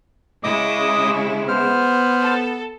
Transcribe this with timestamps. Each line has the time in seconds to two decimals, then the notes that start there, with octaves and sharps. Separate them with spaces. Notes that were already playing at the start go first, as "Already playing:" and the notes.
0.44 C#3 G#3 E4 D#5 D6 D#6
1.48 B3 C5 F6
2.22 A4